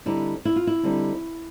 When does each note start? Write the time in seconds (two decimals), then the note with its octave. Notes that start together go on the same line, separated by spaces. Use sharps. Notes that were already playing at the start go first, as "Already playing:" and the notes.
0.06 D3 G3 C4 D#4 E4
0.45 E4
0.56 F4
0.67 E4
0.83 D3 G3 C4 D#4